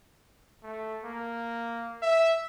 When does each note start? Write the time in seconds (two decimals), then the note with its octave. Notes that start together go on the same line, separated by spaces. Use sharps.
0.63 A3
1.04 A#3
2.02 E5